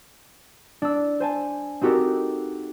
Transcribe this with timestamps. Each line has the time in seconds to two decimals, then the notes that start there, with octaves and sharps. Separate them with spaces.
0.82 D4 E6
1.20 C5 G#5 A5
1.81 C4 D#4 F#4 G4 A4 A#4